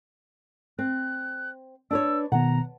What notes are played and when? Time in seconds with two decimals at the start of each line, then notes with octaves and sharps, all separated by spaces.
0.79 C4 F#6
1.91 D4 B4 C#5 E6
2.32 B2 D#3 B3 F#5 A#5